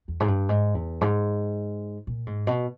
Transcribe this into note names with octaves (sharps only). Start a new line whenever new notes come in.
E2
G#2
G2
G#2
E2
G#2
A#2
G#2
B2